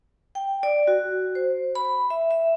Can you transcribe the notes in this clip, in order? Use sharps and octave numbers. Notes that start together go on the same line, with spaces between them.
G5
D5
F#4
C5
B5
E5
E5